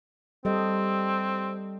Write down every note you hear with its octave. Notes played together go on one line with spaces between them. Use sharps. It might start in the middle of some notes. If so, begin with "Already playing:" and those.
G3 C4 A4 D#5